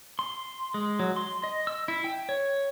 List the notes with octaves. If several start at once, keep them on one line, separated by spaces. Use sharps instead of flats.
C6
G#3
F#3
C6
D#5
E6
E4
G5
C#5